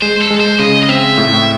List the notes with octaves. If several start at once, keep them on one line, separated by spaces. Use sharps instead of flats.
G#3 C5
A4
G#3
C5
C#3 D#5
D#5
C4 E5
A2